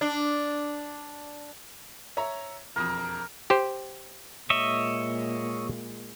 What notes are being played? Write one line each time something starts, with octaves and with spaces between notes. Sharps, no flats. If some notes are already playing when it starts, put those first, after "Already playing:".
D4
C#5 E5 A#5
E1 F2 A#4 D#6
G4 C5
A#2 G#3 C#5 D#5 E5